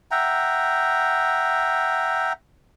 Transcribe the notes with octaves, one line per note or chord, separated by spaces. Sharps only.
E5 F#5 G5 A#5